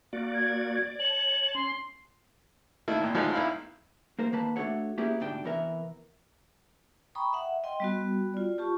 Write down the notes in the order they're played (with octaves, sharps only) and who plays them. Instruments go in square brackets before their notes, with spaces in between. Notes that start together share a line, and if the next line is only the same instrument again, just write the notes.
[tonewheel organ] A#3 F#4 D5
[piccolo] G#6
[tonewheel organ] D5
[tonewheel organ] C#5 A5 [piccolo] F#7
[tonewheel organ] C#4 [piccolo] C6
[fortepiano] D#3 A3 A#3 E4
G#1 A#2
F3 F#3 G#3 A3 D#4
B1 D#4 E4 F5 B5
[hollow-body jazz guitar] A#3 A#4 C5
D#3 A#3 B4 A5
A3 D4 F#4 A4 C#5 F#5
A#3 B3 C#4 E4 G4 G#4
D2 G#2 B2 D4 G5
C3 E3 B3 A#4 E5
[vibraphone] G5 A#5 B5 C#6 D#6
E5 F#5
D#5 G5 C6
G3 B3 F#4
F4 D5
F4 G4 A5 C#6